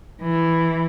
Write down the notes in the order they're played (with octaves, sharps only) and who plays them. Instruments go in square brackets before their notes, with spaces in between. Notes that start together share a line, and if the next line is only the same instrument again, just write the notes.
[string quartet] E3